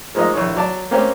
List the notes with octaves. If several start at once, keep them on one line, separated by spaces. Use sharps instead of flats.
F3 G#3 A#3 D#4 D#5
A#1 E3 C#5
F#3 D5 A5
A#3 C4 C#4 G4